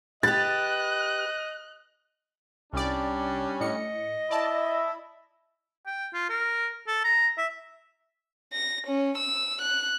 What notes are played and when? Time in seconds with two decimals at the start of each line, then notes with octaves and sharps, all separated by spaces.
0.23 G4 B4 D#5 F#6 A6
2.73 C2 G3 C#4 D4 D5
3.61 A2 D#5 C#7
4.31 E4 D5 E5 A5
5.86 G5
6.14 F4
6.30 A#4
6.87 A4
7.04 A#5
7.38 E5
8.53 A#6
8.87 C#4
9.18 E6
9.61 F#6